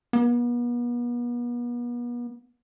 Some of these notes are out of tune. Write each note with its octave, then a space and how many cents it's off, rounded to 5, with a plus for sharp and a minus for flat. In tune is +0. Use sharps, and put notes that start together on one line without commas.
B3 -40